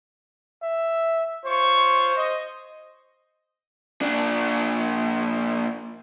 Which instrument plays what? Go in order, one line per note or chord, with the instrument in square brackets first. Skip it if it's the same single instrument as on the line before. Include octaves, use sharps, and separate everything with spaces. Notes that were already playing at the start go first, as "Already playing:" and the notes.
[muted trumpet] E5
[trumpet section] F4 C#5 C#6 [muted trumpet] C5
[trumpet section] D#5
[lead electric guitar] A#2 D4